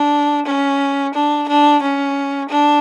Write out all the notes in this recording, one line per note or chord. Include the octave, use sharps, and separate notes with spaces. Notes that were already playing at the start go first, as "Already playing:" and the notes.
Already playing: D4
C#4
D4
D4
C#4
D4